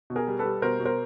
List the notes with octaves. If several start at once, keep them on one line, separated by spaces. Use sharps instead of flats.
B2
G#4 A#4
G3
A4 B4
G3
B2 A#4 C5
B2
A#4 C5